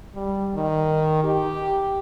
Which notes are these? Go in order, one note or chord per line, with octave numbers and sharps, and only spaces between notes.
G3
D#3
G4